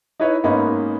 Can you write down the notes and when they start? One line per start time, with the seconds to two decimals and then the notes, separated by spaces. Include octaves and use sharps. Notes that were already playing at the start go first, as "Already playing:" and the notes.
0.20 D#4 E4 B4 C#5 D#5
0.44 G#2 A#3 B3 C#4 D#4 B5